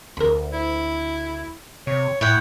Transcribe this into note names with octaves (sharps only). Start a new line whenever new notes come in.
D2 A#4 B5
E4
C3 C#5
A2 E4 C#5 F#5 G5